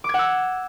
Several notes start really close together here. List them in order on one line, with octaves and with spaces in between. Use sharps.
D6 G#6 F#5 E6